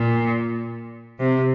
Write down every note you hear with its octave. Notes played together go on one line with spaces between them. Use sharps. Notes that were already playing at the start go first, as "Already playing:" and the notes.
Already playing: A#2
C3